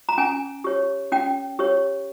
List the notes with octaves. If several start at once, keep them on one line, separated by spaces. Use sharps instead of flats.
A#5
C#4 G#5
G4 C#5
C#4 G5
G4 C#5